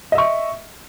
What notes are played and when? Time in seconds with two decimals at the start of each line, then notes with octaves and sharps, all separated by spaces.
0.12 D#5
0.15 E5
0.18 C#6